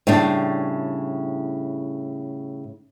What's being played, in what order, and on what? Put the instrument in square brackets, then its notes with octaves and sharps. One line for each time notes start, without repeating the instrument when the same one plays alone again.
[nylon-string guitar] A2 C#3 G3 D4